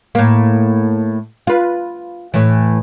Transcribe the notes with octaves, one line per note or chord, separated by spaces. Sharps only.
A2 A#3
F4 B4
A2 E3